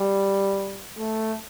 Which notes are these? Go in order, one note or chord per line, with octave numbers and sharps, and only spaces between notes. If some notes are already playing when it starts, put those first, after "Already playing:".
Already playing: G3
A3